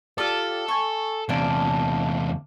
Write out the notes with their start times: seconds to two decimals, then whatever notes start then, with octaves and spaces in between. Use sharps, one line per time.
0.18 F4 G4 A4 D5
0.68 G#5 C#6
1.29 E2 C3 A#3 D4